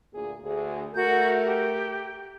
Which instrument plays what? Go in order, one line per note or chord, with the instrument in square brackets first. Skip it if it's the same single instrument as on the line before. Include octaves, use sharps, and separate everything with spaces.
[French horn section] D2 A#2 G#4
D2 G#4
[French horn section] A3 A#4 [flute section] F#4 F#5 G6
[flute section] G4